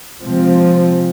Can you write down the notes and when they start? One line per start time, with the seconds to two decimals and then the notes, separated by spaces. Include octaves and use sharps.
0.22 C3 F3 G#3 C4